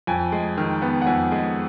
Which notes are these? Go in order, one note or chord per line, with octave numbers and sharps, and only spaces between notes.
F2 G#5
G#3
D#3
B3
F#5
F2 G#5
G#3